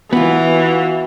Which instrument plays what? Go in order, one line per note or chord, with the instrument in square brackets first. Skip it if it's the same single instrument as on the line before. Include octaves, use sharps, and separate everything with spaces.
[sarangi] E3 [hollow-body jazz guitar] B3 F4 [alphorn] F#4